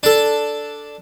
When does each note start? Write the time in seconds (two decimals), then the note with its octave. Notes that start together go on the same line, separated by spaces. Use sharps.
0.03 D4 A4